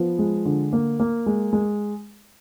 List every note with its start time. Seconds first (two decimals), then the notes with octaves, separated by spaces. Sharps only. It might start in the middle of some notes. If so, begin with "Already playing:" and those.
Already playing: F3 B3
0.19 G#3
0.45 D3
0.73 A#3
1.00 A#3
1.26 G#3
1.53 G#3